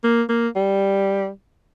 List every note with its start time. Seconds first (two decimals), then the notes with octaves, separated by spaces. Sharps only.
0.04 A#3
0.29 A#3
0.56 G3